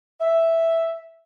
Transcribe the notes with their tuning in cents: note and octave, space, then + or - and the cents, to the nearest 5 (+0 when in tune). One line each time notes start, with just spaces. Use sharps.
E5 +0